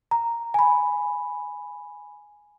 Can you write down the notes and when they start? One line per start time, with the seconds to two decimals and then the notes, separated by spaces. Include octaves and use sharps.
0.11 A#5
0.54 G#5 B5